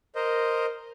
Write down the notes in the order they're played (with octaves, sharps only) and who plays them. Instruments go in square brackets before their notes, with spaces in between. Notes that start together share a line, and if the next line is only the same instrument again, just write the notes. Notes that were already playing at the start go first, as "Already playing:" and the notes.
[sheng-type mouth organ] A#4 C5 D#5